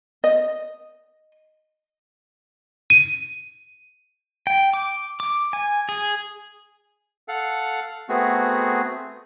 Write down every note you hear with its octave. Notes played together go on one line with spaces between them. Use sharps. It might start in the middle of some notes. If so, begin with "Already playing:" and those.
D#5
D#7
G5
D6
D6
G#5
G#4
A4 F5 F#5
A3 B3 C4 F#4 G#4